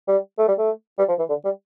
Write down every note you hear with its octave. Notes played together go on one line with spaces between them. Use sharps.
G3
A3
G3
A3
G3
F3
E3
D3
G3